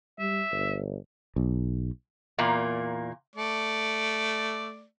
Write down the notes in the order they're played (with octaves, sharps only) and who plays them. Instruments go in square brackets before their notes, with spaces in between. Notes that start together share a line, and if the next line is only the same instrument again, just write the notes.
[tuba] G3 [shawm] E5
[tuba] G1
[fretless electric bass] B1
[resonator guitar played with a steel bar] E2 A#2 A#3
[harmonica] A3 D5